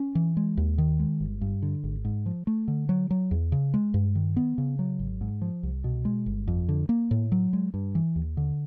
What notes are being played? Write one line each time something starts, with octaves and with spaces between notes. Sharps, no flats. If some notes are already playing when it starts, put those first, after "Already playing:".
Already playing: C#4
E3
G#3
D#2
D#3
G#3
G1
G2
D3
G#1
G#2
F3
A3
D3
F#3
F#3
E2
C#3
G#3
G2
D#3
B3
C#3
F#3
G#1
G#2
F3
C2
B2
G#3
G1
F2
D3
A#3
A2
F#3
G#3
G2
E3
D#2
D3